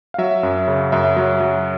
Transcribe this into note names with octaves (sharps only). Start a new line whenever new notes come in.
F5
F#3 E5
F#2
C#3
F#2 E5
F#3
F#3